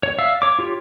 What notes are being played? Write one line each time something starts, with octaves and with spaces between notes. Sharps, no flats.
C#5
D5 E5 F5 E6
C#5 D6
F4 G4 C#5